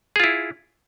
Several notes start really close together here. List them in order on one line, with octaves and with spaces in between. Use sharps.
G#4 F4 E4